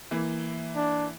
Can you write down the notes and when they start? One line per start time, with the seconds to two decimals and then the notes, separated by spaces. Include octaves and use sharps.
0.11 E3 A#3 E4
0.76 D4